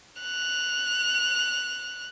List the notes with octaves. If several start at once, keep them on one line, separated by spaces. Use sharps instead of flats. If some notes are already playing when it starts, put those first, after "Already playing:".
F#6 F7